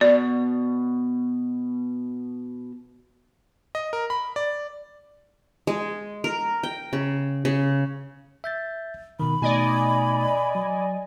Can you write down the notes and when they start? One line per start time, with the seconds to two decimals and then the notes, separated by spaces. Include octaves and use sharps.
0.01 B2 D5
3.75 D#5
3.93 A#4
4.10 B5
4.36 D5
5.67 G#3
6.24 A#4
6.63 G5
6.93 C#3
7.45 C#3
8.44 E5 G6 A6
9.20 B2 D#3 B5
9.42 B2 A3 D#4 D5 D#5 G#5
10.55 F#3